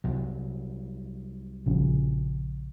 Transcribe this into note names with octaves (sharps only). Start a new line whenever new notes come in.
C2 F#3
A#1 C#3 F3